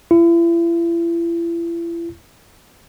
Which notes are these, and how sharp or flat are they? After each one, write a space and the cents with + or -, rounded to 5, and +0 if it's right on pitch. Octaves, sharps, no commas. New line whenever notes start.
E4 +40